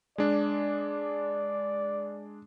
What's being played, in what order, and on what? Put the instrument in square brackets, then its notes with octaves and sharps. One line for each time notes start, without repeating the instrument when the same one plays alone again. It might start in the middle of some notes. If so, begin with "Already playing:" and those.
[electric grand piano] G#3 D4 [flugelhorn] D5